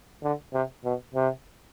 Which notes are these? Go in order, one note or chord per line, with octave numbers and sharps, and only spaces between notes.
D3
C3
B2
C3